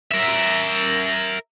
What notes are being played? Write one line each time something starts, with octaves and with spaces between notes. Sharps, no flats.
A#4 E5